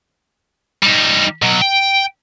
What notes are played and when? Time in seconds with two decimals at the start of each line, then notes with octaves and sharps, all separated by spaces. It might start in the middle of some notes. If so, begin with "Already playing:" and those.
0.83 G3 D#4
1.42 B2 F#3
1.62 G5